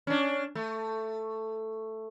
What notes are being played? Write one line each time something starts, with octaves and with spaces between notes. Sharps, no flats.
C#4 D4
A3